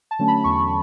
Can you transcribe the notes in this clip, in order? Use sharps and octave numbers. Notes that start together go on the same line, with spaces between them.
A5
D3 F#3 A3 C#4
B5
E2 C#6